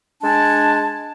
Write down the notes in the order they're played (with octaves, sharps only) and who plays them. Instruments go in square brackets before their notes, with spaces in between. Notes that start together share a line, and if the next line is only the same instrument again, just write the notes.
[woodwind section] G#3 D4 G#5 A5